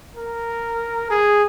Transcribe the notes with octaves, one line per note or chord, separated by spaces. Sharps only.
A#4
G#4